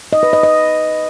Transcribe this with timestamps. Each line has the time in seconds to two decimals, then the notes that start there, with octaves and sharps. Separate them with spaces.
0.13 D#5
0.23 B4
0.33 D#5
0.43 D#5